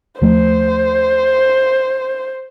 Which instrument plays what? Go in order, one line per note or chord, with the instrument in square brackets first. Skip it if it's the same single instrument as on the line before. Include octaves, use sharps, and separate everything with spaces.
[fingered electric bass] D#2 F3 A3 [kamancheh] C5